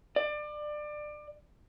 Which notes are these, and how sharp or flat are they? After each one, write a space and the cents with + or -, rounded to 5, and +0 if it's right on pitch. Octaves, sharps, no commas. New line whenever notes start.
D5 +25